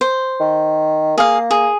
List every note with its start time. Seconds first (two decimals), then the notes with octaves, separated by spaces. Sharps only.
0.01 C5
0.40 D#3
1.18 A#3 G#4 F5
1.51 G#4